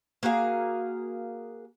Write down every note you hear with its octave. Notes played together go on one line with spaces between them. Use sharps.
A#3 F#4 G#4 F5